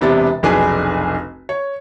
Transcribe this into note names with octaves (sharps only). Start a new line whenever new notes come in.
E1 C3 B3 D4 A6
F1 B1 D4 G#4 B4 G#5
C#5